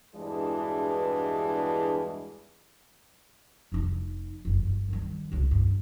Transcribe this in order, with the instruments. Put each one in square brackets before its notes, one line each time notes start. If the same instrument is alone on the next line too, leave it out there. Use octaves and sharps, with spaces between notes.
[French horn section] E2 G2 B2 E3 G#3 D4
[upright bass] F1 D#4
F#1 D#3
G1
D#3 G3
C#2 B2
G2